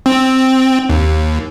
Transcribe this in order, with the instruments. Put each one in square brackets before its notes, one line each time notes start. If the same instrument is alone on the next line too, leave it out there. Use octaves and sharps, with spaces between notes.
[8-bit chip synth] C4
D#2